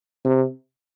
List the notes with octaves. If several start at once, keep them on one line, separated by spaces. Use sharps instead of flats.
C3